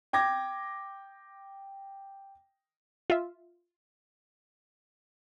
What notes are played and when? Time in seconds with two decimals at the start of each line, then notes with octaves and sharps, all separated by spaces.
0.13 G5 D6 G#6 A#6
3.10 F4 E5